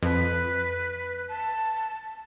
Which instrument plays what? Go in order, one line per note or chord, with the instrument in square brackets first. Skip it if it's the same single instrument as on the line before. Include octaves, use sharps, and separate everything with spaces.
[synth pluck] F2 [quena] B4
[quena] A5